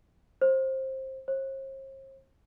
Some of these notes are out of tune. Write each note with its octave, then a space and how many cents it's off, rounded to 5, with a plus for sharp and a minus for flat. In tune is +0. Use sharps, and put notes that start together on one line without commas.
C5 +20
C5 +45